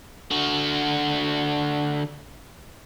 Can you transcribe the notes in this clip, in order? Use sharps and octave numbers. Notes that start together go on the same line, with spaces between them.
D3 F#4